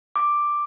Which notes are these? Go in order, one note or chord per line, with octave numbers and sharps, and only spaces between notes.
D6